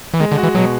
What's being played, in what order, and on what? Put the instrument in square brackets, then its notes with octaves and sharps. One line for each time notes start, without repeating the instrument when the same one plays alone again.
[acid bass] E3
[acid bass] D#3 [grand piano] G#3
[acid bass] D3
[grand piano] F#4
[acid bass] E3
[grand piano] B2 [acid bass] F#3